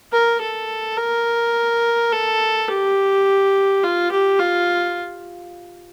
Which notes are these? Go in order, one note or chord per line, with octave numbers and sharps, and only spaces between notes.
A#4
A4
A#4
A4
G4
F4
G4
F4